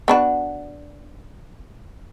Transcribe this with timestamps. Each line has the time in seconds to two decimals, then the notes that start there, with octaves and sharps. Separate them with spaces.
0.08 B3 D4 F#4